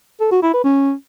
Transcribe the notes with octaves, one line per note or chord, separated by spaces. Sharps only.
A4
F#4
E4
B4
C#4